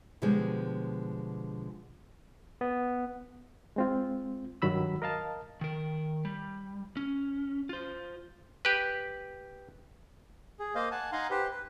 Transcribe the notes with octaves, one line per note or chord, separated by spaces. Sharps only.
B2 D3 F3 G3 G#3
B3
G#3 C4 F4
G2 D#3 F#3 B5 E6
A#4 D#5 F5 A5
D#3 A#4
G3
C#4
F4 C5
G4 B4
G#4
A#3 C5 D#5 F5
F#5 G#5 A5
D#4 F5 F#5 G#5 A#5 C6
G4 B4 C5
B4